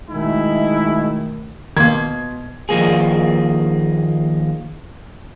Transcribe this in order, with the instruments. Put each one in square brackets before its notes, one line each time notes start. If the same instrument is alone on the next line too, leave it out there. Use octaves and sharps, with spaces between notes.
[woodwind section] B2 D#3 A3 [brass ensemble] G#3 D#4 E4
[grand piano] B2 C6 [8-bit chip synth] D#3 A#3 [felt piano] G#6
[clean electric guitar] D#2 F3 A#3 G#4